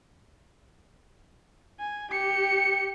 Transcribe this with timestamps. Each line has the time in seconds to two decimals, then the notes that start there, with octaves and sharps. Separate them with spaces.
1.79 G#5
2.11 G4 C#7